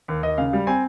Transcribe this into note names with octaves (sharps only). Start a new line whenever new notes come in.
D#2
D#2 D#5
C#3 F5
G3
C4 G#5